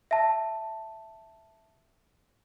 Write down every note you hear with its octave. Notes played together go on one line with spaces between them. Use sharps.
E5 A5